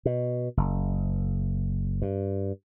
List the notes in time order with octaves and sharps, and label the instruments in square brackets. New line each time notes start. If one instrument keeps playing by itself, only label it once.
[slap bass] B2
F#1
G2